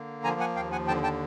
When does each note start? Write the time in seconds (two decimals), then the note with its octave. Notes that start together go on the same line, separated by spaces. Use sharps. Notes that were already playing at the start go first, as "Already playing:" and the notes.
Already playing: D3 A#3
0.24 F3 G#5 A#5
0.40 F#5 G#5
0.55 D#2 F5 G5
0.72 F#5 G#5
0.88 D3 G5 A5
1.03 G5 A5